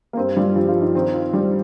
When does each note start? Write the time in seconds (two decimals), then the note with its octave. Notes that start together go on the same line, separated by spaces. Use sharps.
0.13 A#3
0.17 G2 C4
0.37 G3 F4
0.55 G2 F3
0.68 F4
0.76 F3
0.82 D#4
0.95 D#3 C4
1.08 C4
1.14 F4
1.33 G3 C4